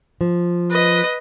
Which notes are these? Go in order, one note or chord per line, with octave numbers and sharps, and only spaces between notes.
F3
B4 D#5